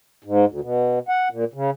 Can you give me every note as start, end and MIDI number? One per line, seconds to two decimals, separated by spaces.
0.24 0.45 44
0.45 0.60 38
0.61 0.99 47
1.09 1.28 78
1.31 1.44 46
1.54 1.70 49